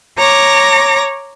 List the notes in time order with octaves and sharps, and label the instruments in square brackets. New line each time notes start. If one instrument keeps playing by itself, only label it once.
[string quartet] C#5 A#5 D6 A#6